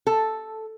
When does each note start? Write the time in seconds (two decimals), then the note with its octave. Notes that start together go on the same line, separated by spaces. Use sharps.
0.07 A4